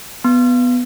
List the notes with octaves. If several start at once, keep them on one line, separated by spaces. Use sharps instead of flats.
B3